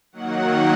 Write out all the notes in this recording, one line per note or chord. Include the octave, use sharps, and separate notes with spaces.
D#3 F#3 A#3 F#5